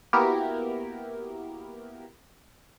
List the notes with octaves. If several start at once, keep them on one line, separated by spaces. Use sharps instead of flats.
A#3 B3 E4 F#4 G4 A#4